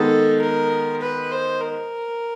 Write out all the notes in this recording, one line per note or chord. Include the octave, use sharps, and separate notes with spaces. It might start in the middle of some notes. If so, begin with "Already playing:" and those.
Already playing: D#3 G#3 B3 A4
A#4
B4
C5
A#4